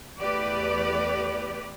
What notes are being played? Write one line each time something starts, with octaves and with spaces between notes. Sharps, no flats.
E2 A3 G4 B4 D5